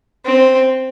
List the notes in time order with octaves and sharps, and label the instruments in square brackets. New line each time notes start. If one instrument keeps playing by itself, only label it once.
[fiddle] C4